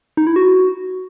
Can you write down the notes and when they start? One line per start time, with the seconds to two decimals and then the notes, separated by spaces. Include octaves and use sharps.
0.17 D#4
0.27 E4
0.36 F#4